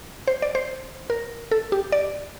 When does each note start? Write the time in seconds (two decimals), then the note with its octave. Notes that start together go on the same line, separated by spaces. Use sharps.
0.28 C5
0.42 D5
0.55 C5
1.10 A#4
1.52 A4
1.72 G4
1.92 D5